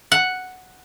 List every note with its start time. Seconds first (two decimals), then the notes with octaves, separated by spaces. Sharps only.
0.12 F#5